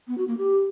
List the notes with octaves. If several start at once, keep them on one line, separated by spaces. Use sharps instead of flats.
B3
F#4
A#3
G4